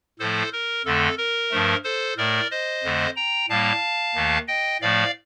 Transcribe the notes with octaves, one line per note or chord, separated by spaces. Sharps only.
A2 F3 A3 A4 C5
A#4
F2 D3 A3 A4
A#4
G2 F3 A3
A4 C5
A2 A3 A#4 D5
C5 D#5
F2 D3 A3
G5 A#5
A2 G3 A#3 F5 A5
D#2 D#3 A3
D#5 G5
A2 F3 A3 D5 F5